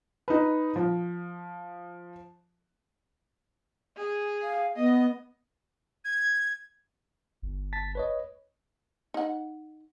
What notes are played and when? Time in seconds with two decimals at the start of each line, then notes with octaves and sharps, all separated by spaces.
0.28 D#4 B4
0.76 F3
3.97 G#4
4.43 F5
4.76 B3 D#5
6.05 G#6
7.42 G1
7.73 A5 A6 B6
7.95 B4 C#5 D#5
9.14 D#4 F#5